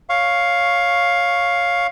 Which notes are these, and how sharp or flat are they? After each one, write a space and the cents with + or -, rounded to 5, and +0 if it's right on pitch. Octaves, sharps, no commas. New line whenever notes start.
C#5 +0 F5 +5 C#6 +0